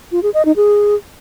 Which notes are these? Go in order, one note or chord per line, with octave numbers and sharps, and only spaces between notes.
F4
G#4
D#5
D#4
G#4